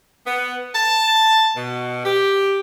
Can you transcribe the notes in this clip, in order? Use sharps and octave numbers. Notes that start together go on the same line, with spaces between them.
B3
A5
B2
G4